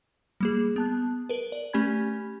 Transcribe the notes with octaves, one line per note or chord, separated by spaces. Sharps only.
G3 A#3 G#4
B3 A5 F#6
A#4 B4
D5
A3 C#4 G4 G#5 B5 G#6